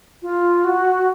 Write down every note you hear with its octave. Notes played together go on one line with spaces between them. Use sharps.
F4
F#4